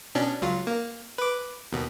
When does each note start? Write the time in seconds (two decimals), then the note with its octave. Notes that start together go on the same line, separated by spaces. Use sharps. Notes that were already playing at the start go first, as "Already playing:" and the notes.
0.15 B2 C#4 D4
0.42 C#2 F#3 F4
0.67 A#3
1.18 B4 D6
1.73 D#2 B2